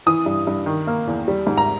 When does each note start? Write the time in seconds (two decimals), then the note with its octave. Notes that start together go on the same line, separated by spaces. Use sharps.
0.06 E3 D#6
0.26 G2
0.47 G2
0.66 D#3
0.87 A#3
1.07 E2
1.28 G3
1.47 G#2
1.58 A#5